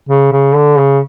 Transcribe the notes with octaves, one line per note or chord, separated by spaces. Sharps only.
C#3
C#3
D3
C#3